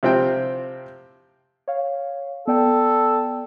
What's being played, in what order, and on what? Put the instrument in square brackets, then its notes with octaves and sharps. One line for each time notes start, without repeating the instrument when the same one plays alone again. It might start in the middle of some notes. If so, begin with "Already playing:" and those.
[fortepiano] C3 F3 C4 E4 G5
[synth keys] C#5 F5
[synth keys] B3 D5 G5 [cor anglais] A4